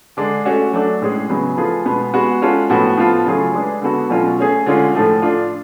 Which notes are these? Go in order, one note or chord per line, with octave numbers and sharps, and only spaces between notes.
D3 G#3 D4
A3 C#4 F#4
F#3 A3 D4
A2 G#3 C#4 G#4
C#3 F#3 B3
F3 A3 F4 G#4 B4
B2 G#3 B3
G#3 B3 F#4
G#3 C#4 F4 A4
A2 F3 B3 F#4
F3 B3 F4 A4
C#3 F#3 A3 F4 G#4
G#3 D4 G#4 B4
D3 G#3 B3 F#4 A4
B2 F#3 A3 C#4 F4
A3 C#4 G#4
D3 G#3 C#4 F4
A2 F3 A3
A3 D4 F4